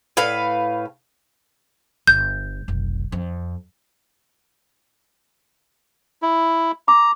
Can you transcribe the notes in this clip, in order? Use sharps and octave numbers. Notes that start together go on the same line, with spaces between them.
A2 B4 F5
G1 G6
F1 B1
F2
E4
A#5 D6